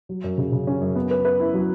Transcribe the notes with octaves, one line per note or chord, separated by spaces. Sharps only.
F#3
F#2
C#3
C#3
C#4
F#2
B3
B4
B4
E4
F#3